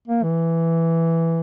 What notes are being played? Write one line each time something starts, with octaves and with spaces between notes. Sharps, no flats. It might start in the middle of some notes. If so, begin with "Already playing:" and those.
A#3
E3